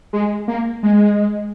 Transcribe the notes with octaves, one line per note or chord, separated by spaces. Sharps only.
G#3
A#3
G#3